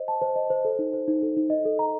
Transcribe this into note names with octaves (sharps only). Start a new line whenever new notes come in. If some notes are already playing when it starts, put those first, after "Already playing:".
Already playing: C5 D#5
A5
C5
D#5
C5
A4
D#4
C5
D#4
A4
D#4
D#5
A4
A#5